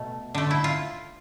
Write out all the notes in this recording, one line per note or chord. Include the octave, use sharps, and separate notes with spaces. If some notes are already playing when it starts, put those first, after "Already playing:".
Already playing: B2 A3
D3 A3
E4
F4